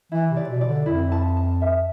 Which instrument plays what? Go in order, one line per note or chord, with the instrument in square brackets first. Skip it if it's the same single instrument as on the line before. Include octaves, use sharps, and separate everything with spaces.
[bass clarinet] E3 [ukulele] E4
[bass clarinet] C3
[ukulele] D5
[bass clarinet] B2
[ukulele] D5
[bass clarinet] D3
[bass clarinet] F2 [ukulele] E4
[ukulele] A5
A5
E5